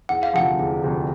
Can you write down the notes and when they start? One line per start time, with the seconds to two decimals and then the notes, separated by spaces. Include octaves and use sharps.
0.09 E1 F#5
0.23 F5
0.33 D2 C3 F3 F#5
0.59 E1
0.84 D2 C3 F3